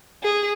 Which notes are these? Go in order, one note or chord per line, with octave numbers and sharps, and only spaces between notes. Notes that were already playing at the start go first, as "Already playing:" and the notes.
G#4